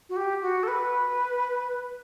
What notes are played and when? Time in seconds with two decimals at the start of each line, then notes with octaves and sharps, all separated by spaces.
0.09 F#4
0.16 G4
0.42 F#4
0.63 A4
0.68 B4